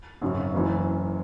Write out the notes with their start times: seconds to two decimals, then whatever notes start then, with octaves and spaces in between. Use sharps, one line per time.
0.21 G#1 F#2 C#3 F#3
0.54 F#1 F#2 E3